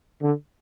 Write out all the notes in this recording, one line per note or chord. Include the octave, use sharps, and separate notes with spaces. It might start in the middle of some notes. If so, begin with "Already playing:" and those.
D3